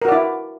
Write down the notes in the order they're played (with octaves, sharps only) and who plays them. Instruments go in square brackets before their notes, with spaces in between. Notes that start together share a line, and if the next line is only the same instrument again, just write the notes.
[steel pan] A#4
F#4
D5
E4